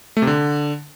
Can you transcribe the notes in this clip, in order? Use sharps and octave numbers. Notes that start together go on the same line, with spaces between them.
A3
C3
D3